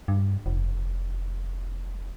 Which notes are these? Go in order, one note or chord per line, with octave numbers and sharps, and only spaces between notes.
G2
F1